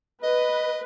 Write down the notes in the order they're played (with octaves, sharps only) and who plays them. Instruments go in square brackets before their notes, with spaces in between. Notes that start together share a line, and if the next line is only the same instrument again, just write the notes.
[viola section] B4 [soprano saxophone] D#5